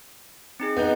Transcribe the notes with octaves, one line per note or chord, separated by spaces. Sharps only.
C4 D#4 G#4
B3 D#4 F#5 G6